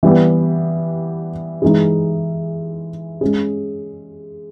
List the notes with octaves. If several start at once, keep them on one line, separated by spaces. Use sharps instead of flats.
E3 G3 B3 G4
E3 G#3 D#4 G#4
G#3 C#4 G#4